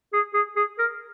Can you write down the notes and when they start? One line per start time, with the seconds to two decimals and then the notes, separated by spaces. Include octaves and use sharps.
0.13 G#4
0.34 G#4
0.56 G#4
0.78 A#4